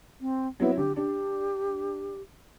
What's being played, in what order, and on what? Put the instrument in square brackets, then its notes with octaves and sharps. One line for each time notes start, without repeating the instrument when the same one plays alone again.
[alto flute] C4
[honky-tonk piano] F#3 C4 E4 [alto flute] B3
[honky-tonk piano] D3 [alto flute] G4
[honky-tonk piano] D4 [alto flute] G4